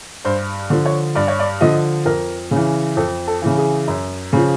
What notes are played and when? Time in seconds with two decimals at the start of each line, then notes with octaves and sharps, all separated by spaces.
0.25 G2 C5
0.70 D3 F3
0.86 C#5
1.15 G2 D5
1.28 C#5
1.39 D5
1.61 D3 F3 D#5
2.05 F2 A#4
2.51 C#3 E3
2.96 F2 A4
3.27 A4
3.42 C#3 E3
3.58 G#4
3.88 F#2
4.33 C#3 F3